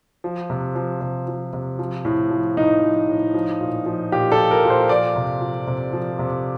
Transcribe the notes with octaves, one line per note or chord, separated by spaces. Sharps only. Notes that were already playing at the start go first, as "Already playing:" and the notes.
F3
C3
F3
C3
F3
C3
F3
A2
F3
A2 D#4
F3
A2
F3
A#2
F3
A#2 G4
A4
F3
A#4
A#2
C5
F3 D5
C3
F3
C3
F3
C3